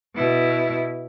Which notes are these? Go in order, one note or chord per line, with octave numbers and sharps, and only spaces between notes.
B2 E4